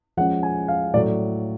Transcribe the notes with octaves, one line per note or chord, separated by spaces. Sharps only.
F3 G#3 C#4 F#5
G#5
F5
A2 F#3 A3 D5